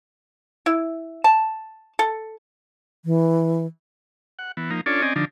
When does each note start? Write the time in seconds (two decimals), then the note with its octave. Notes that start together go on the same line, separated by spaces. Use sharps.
0.66 E4
1.24 A5
1.99 A4
3.04 E3
4.39 F#5
4.57 E3 B3
4.71 F3 A#3 D#4
4.86 C#4 D4 F4 A4 C#5 D5
5.02 C4 C#4 D5 D#5 G#5
5.16 D3 F3 D4 D#4